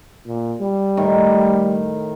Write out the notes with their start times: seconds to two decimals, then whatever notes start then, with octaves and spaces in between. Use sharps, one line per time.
0.26 A#2
0.61 G3
0.97 A2 D#3